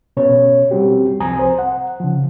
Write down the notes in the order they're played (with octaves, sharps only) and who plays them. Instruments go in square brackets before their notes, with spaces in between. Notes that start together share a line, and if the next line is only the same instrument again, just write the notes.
[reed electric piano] B2 C#4 C#5
G3 C4 F#4 G4
C2 F3 C4 G#5 A#5 D#6
C5
F#5
C#3 F3